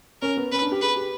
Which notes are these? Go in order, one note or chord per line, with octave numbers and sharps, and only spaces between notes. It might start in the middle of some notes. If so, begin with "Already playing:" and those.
C#4 A#4
B3
C#4 B4
D4
G4
G#4 B4
G4